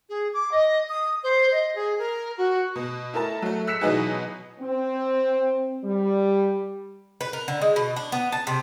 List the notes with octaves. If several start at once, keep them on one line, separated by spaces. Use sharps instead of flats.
G#4
D6
D#5
D#6
C5
D#5
G#4
A#4
F#4
B2
E4 A4 A#4 A5
F#3 A3
E6 F#6 B6 C#7 E7
B2 E3 F#3 B3 D#4 G#4
C4
G3
B4
A#4
D3
G#3
B2
D4
B3
A5
C3